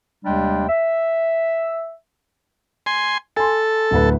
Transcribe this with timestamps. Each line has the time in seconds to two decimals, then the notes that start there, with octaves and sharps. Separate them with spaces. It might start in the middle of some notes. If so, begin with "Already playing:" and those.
0.25 D#2 C3 G3 G#3 D4 G5
0.69 E5
2.86 G#5 C6
3.37 A4 G#5 C6
3.91 D1 D2 B4